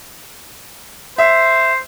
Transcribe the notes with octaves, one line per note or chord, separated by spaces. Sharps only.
C5 E5